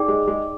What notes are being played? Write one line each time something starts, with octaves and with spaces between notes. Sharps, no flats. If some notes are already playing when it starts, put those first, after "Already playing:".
Already playing: D#4 G#4 D5 G5 D6
G#3
G#3